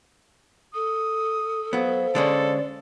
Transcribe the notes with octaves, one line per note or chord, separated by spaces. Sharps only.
A4 D#6
F#3 B3 C5 F5
D3 G#3 C#4 A4 D5